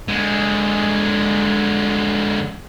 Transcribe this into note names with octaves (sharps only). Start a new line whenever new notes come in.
D3 G#3